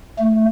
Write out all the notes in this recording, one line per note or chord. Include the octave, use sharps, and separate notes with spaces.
A3